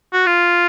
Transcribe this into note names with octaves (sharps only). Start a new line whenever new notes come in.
F#4
F4